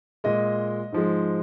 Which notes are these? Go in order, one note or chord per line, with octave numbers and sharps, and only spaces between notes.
A#2 G#3 D#5
G#2 F3 G#3